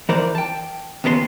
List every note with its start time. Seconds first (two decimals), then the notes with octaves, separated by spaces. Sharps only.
0.09 E3 A#4 C5 D5
0.35 G5 A5
1.04 D#2 C#3 B3 A#4 C6